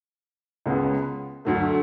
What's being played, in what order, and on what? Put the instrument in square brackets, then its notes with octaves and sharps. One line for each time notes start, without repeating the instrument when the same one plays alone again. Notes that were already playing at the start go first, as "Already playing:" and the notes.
[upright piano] C#2 C#3 G#3 B3
D2 D3 F#3 A3